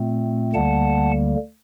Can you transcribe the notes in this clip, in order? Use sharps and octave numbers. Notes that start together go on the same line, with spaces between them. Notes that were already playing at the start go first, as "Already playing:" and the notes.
Already playing: A#2 A3 C4
D2 D3 G3 A#3 F#5 A5